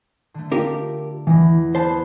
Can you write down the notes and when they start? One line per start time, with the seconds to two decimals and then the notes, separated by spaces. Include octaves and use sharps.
0.34 D3 A3
0.52 F4 G4 A#4
1.27 E2 E3 A#6
1.75 B3 C5 A5